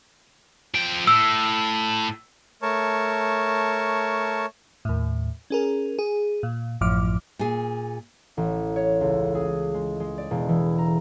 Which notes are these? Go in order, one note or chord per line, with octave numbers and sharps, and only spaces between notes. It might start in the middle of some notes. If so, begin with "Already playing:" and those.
F3 G5
A2 E6
A3 A#4 C#5 A5 C#6
D#2 A2
C#4 G#4 A#4
G#4
A#2
A1 F#2 A2 F3 D6 F6
A#2 G#4
A1
C#5
C#2
G#4
G#3
G#3
D5
E1
E3
A#5